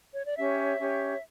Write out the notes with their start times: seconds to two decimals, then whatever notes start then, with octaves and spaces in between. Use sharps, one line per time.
0.14 C#5
0.25 D5
0.37 C#4 G4 C#5 E5
0.78 C#4 G4 C#5